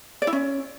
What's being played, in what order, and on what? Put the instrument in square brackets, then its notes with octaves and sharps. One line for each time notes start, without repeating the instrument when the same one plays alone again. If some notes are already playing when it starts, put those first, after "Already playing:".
[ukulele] D5
E4
C#4